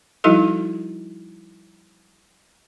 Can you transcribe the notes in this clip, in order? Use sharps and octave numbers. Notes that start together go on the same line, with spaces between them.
F3 G3 D#4 E4 F#4 A4